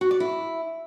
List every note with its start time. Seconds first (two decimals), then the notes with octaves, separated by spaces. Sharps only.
0.01 F#4
0.11 D5
0.20 E4